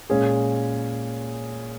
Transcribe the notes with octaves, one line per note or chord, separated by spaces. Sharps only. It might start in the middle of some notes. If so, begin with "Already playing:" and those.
A#2 G#3 C#4 G#4